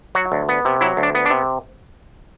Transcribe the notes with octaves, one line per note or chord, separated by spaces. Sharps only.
F#3 F#4
D2
B3
C3
F#3 E4
D2
D4
B3
D4
C3